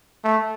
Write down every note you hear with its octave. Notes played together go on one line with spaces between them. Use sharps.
A3